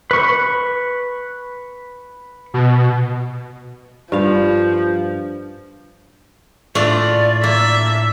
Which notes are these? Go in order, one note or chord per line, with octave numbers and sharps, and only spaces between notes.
B4 C#6
B2
G2 F3 F5
A2 A3 D4 F4 D5
A#3 E5